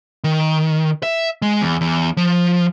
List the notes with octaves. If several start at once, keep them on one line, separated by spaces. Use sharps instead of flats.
D#3
E5
G#3
E2
E2
F3